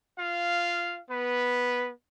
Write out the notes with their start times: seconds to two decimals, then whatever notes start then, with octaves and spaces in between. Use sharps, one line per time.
0.18 F4 F5
1.09 B3 B4